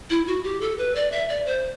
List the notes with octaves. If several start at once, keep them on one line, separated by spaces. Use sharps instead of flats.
E4
F#4
G4
A4
B4
D5
E5
D5
C5